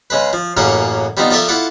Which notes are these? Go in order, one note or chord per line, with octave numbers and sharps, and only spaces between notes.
C#3 G#3 B4
F3
A1 F#2 C#3 A#3 C#4 F#5
G3 B3 C4 D#4 F4
F3 F4 A4 A#4 D5 E5
E4 F4 A4 F#5 D6